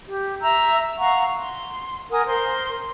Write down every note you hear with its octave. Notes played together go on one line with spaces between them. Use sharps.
G4
E5 A#5 E6
F5 F#5 A#5 C#6
C6
A#4 F#5 G#5 D#6
A#4 C5 C6